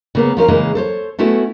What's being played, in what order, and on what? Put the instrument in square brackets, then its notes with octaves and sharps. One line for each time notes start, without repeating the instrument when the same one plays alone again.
[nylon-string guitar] C#3 A#3 B3
F3 C#4 A#4 F5
C#3 E3 G#3 A#3
A4 C5 C#5
A3 B3 C#4 E4 F#4 A4